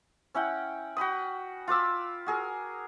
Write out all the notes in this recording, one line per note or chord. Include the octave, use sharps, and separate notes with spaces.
C#4 E4 F#5 G5
F#4 G5 B5 D#6
F4 B4 D6 E6
F#4 G#4 A#4